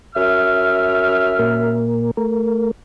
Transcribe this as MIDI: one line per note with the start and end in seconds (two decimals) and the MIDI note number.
0.15 1.81 42
0.15 1.81 76
0.15 1.81 89
1.39 2.11 46
1.39 2.11 58
1.39 2.11 70
2.17 2.71 57
2.17 2.71 70